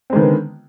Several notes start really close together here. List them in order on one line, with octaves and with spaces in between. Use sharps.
C4 G#3 D#3 B3 D3